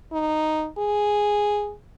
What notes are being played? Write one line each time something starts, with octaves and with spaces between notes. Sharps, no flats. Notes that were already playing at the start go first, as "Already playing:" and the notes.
D#4
G#4